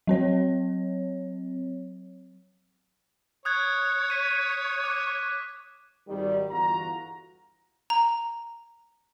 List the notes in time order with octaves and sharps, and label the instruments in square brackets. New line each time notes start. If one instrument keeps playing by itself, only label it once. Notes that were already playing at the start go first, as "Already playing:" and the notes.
[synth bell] F#3 C4 C#5
[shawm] C#5 [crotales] D#6 F#6 G#6
[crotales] B6 D#7
D6 F#6
[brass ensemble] G#1 D#3 G3
G1 E2 F4 F#4 A#5
[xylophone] A#5